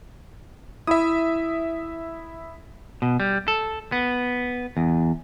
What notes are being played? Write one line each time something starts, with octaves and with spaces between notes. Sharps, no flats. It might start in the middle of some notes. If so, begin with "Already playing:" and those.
E4 E5 D#6
B2
G3
A4
B3
E2